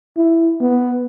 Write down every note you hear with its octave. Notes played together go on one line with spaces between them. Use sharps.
E4
B3